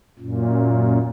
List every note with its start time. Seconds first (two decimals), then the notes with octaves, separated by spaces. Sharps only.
0.19 F#2 A#2